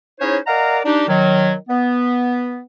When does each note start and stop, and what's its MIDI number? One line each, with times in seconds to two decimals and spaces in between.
0.20 0.38 61
0.20 0.38 63
0.20 0.38 64
0.20 0.38 68
0.20 0.38 72
0.20 0.38 73
0.47 0.79 70
0.47 0.79 74
0.47 0.79 75
0.47 0.79 77
0.47 0.79 78
0.47 0.79 82
0.85 1.05 62
0.85 1.05 63
0.85 1.05 67
1.08 1.54 51
1.08 1.54 54
1.69 2.60 59